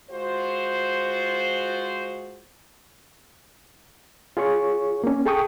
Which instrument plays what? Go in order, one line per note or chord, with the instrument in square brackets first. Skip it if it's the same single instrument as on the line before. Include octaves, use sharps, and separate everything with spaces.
[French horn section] G#3 F4 F#4 C5
[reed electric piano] F4 G#4 C#5 C#6
A#3 C#4
G#4 A4 G5 C#6 D#6